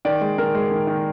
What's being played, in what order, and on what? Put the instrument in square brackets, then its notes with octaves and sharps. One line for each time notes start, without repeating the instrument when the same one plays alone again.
[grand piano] D#3 D5
G#3
D#3 A#4
G#3
D#3
D#3